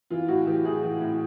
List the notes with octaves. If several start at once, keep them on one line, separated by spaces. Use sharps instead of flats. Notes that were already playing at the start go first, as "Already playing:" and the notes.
E3 F4
A2 F#4
E3 G4
A2 G#4
E3
A2